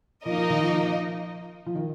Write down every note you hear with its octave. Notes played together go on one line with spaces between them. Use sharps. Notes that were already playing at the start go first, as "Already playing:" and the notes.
F3 A#3 D#4 A#4 D#5
F3
D#3
F3
F3
D#3